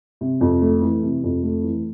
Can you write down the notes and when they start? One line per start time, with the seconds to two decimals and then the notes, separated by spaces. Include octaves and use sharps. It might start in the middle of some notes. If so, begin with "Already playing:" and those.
0.21 C3
0.41 F2
0.61 A3
0.82 E3
1.03 C3
1.24 F2
1.43 A3
1.63 E3